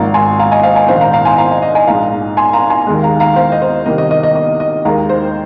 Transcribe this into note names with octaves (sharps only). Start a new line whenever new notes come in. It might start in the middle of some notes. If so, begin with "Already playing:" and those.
Already playing: G#1 G#2 F3 A#3 F5 A#5
G#5 C6
F5 A#5
D#5 G#5
C5 F5
D#5 G#5
A#1 G#2 D#3 C5 F5
F5 A#5
F5 A#5
G#5 C6
F5 A#5
D#5
D#5
D#5 G#5
A#1 G#2 G#3 F5 A#5
G#5 C6
F5 A#5
G#5 C6
D#2 D#3 G#3
F5 A#5
F5 A#5
C5 F5
D#5
C5
C2 C3 D#3 A#3 D#5
D#5
D#5
D#5
D#5
D#5
D#2 D#3 G#3 F5 A#5
C5